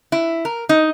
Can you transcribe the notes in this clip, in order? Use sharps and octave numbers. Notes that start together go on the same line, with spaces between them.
E4
A#4
D#4